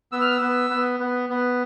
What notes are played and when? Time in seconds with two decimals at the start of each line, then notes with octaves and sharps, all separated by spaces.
0.12 B3 E6
0.21 F6
0.30 E6
0.41 B3
0.70 B3
1.00 B3
1.29 B3